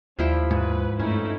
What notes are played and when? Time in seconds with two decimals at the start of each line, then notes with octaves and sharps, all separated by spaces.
0.19 D#2 F3 G3 E4 G5
0.51 G#2 B4
1.00 G2 A3 C#4 D#4 E4